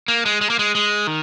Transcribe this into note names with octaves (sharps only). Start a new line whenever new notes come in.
A#3
G#3
G#3
A#3
G#3
G#3
D#3